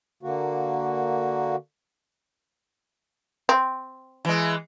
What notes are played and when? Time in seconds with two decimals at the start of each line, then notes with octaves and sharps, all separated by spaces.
0.23 D3 A#3 F#4
3.49 C4
4.25 E3 G#3